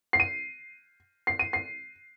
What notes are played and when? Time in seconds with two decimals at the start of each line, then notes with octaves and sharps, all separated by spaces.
0.13 C7
0.20 D#7
1.27 C7
1.39 D#7
1.53 C7